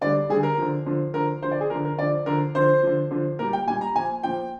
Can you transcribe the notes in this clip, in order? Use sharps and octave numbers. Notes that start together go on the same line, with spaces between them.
D3 G3 D5
D3 G3 G#4
A#4
D3 F3
D3 F3
D3 F3 A#4
D3 F3 C5
D5
G#4
D3 F3 A#4
A#4
D3 F3 D5
D3 F3 A#4
D3 F3 C5
D3 F3
D3 F3
A#2 G3 A#4
G5
A#2 G3 G#5
A#5
A#2 F3 G#5
A#2 F3 G5